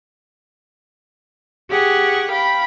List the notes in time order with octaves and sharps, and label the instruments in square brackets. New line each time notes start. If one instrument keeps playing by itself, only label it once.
[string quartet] G4 G#4 F#5 C#6
F5 G5 B5